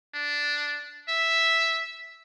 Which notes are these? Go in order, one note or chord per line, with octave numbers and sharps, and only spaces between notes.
D4
E5